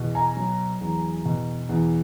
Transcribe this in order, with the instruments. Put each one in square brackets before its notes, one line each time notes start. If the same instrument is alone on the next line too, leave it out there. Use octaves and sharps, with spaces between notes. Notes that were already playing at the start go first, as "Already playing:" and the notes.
Already playing: [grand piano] E2 B2
G#5 A#5
F#3
E2
B2
E2